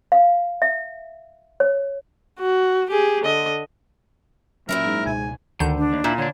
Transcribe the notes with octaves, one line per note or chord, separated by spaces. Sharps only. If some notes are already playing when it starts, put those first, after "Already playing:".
F5
E5
C#5
F#4
G4 G#4
D3 D#5
A#2 F#3 C#4 E4 A#4 E5
G#2
C#2 B2 G#5
D2 D3 D#3 G6
D4
D#2
A#2 E4
D3 D4 C#5